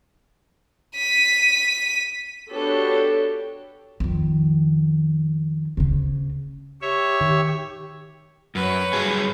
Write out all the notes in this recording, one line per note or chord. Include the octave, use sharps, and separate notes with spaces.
B6 D#7
B3 D4 F#4 G4 A4 C#5
F2 D#3
D2 C#3
G4 C#5 E5
D#3
F#2 B4 C#5
G2 F#3 G#4